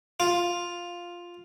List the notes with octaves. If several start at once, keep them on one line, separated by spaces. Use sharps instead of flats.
F4